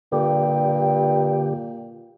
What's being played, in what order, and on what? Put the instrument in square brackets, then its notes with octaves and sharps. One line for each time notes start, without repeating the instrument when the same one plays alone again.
[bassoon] G2 [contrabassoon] A#2 [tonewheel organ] D3 G4 [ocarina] G5